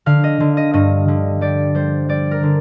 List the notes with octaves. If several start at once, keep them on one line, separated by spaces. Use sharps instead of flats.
D3 F5
D#5
D3
D#5
G2 D#5
D3
G3 D5
G3 C5
G3 D5
A#4
D3